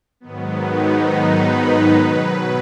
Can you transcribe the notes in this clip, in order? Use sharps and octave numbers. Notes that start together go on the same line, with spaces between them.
G#2 D#3 F#3 B3
D#4
B4
B2 F#3